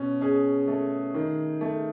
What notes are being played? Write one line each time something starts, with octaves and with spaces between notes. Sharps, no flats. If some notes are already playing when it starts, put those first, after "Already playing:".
Already playing: B2 C#4
C#4 G#4
A3
D#3
A3